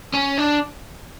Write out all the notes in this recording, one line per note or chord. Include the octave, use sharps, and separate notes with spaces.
C#4
D4